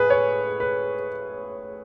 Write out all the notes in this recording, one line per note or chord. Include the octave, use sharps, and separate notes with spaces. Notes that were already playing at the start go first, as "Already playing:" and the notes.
Already playing: A2 G#3 G#4 B4
C#5
B4